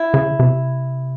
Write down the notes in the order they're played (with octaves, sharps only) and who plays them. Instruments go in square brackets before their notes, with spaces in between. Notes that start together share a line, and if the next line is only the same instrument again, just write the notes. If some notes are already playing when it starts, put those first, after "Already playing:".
Already playing: [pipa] E4
[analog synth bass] C#3
C3